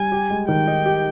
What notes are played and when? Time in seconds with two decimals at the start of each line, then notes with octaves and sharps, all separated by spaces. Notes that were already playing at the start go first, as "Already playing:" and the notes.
Already playing: G3 G#5
0.12 G4
0.30 G#3
0.48 D#3 G5
0.67 D#4
0.86 G4